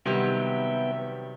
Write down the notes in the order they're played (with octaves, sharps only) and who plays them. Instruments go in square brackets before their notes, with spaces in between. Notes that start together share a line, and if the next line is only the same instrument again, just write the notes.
[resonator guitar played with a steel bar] C3 F#3 G4 [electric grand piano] D#3 G3 [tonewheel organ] B3 G5 [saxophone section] E5